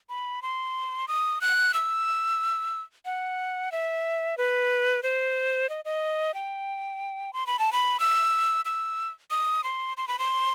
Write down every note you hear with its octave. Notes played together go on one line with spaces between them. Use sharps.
B5
C6
D#6
F#6
E6
F#5
E5
B4
C5
D#5
D#5
G5
C6
B5
A5
B5
E6
E6
D#6
C6
C6
B5
C6